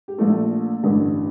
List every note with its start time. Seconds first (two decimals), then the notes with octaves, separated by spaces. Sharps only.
0.08 G4
0.18 A#1 A#2 A3 A4
0.83 A1 G2 D3